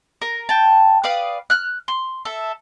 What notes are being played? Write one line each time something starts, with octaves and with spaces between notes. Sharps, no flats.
A#4
G5 A5
B4 D5 F5 D#6
F6 F#6
C6
A4 E5